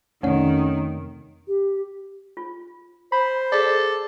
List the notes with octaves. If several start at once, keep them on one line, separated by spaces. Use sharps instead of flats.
F2 C3 D#3 A3 C#4 D5
G4
F4
C5 B5
G#4 A4 D5 F5